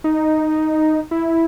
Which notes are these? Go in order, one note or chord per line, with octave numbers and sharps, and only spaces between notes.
D#4
E4